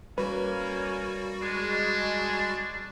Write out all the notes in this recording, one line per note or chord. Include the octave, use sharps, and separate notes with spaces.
G3 A#3 C#4 F#4 B4
G#3 D4